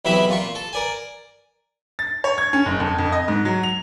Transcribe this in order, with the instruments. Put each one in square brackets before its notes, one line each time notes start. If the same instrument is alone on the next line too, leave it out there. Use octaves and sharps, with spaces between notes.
[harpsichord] B1 C3 E3 E4 E5 B5
A#2 F4 C#6
A4
A#4 D5 G#5
[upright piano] A6
C#5
G#6
C#4
F#1
F2
F2
D#5
G#2
F#3
F7